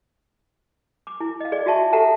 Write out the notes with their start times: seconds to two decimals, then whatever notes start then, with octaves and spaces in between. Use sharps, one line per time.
1.07 D6
1.20 E4
1.40 D#5 F5
1.52 G#4 D5
1.66 F4 F#4 G#4 E5 A5 C#6
1.93 G4 A4 E5 F#5 A5 A#5